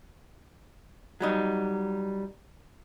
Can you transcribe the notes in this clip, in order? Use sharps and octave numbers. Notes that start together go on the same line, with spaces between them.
F#3 G3 D#4